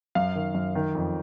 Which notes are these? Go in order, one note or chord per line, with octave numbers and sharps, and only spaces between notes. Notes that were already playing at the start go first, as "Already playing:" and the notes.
F#2 F5
D#3
F#2
D#3
F2